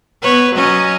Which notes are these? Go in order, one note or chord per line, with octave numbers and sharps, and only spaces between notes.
B3 B4 C#5
F#3 C#4 D#5